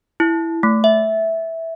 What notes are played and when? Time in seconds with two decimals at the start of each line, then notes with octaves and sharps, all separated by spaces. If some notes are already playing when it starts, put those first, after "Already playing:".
0.20 E4
0.63 A3
0.84 E5